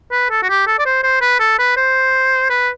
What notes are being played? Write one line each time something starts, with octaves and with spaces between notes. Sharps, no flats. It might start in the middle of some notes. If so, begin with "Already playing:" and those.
B4
A4
F#4
G4
A4
D5
C5
C5
B4
A4
B4
C5
B4